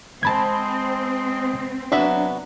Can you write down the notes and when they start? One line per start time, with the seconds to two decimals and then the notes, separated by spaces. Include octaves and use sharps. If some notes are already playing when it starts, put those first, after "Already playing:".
0.23 G#3 C4 A5 B5 G#6
1.92 F#3 B3 D4 F#4 E5